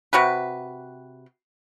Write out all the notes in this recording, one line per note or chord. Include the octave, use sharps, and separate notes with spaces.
C3 F#4 G4 B4